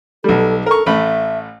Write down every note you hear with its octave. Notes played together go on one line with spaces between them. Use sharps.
B1 G3 A4
A4 A#4 C#6
A1 A3 E5 B5